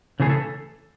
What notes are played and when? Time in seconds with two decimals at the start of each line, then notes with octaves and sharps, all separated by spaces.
0.20 C#3 E3 A3 G#4
0.30 A4